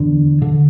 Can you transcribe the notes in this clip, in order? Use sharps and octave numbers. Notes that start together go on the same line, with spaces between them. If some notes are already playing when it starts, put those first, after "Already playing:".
Already playing: E2 D3
D3